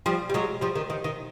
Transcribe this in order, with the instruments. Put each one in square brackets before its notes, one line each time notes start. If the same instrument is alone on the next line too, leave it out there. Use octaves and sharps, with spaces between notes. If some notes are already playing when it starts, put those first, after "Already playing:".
[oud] F3 G3
G3
F#3 G#3
F3 G3
D#3
D#3
D#3